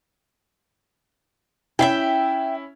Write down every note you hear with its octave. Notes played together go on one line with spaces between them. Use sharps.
C#4 E4 E5 F5 G5